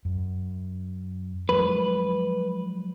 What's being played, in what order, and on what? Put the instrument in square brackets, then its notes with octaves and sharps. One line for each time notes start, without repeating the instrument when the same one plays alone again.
[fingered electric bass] F#2
[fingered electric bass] F3 F#3 G#3 [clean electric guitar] B4